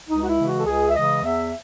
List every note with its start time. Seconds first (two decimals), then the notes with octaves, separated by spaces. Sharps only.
0.08 C#2 D#4
0.22 F#4
0.27 E4
0.36 C#3 E3 G#3
0.46 F#4
0.58 A4
0.66 C#2 G#4
0.88 E5
0.94 C#3 E3 G#3 D#5
1.23 E2 E5